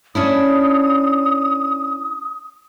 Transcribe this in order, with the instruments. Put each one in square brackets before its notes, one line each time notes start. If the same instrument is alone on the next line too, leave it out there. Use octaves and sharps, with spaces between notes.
[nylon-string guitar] C#4 D4 E4 [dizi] D#6